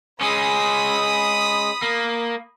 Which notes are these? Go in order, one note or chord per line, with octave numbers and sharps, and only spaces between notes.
G#3 C#4 B5 D#6 B6
A#3